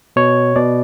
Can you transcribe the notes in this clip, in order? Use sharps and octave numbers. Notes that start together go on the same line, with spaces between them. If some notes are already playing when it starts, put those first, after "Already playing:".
B2 C#5
B2 D5